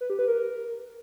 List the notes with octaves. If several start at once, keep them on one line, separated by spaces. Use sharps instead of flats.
B4
G4
B4
A#4